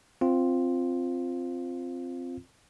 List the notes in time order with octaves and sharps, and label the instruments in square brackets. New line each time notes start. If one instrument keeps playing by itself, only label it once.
[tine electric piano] C4 F4